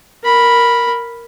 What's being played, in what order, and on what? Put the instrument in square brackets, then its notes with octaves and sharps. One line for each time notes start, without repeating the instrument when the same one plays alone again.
[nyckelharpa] A#4 B5